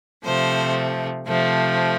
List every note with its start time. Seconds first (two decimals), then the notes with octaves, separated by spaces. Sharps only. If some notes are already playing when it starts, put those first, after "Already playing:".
0.24 C3 F3 A3 C5
1.26 C3 F3 A3